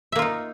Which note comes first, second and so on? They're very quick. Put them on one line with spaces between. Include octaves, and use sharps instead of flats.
E5 A#3 F4 D#4